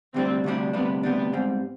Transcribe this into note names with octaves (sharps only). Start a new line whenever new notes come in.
D2 C3 G3 C4 D4
D2 C3 G3 D4
D2 C3 G3 B3 D4
D2 C3 G3 B3 D4
G#2 G3 C4